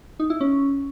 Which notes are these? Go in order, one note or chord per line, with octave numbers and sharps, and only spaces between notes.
D#4
E4
C#4